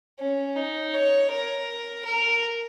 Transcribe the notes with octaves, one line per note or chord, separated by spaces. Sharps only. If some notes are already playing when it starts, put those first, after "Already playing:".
C#4
D#4
C#5
A#4
A#4